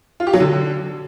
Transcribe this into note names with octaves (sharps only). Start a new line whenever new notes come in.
F4
G4
F#3
D3